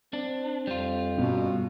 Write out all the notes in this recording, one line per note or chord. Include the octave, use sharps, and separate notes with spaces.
C4 D4
F2 G3 F4
G2 B2 B3 C#4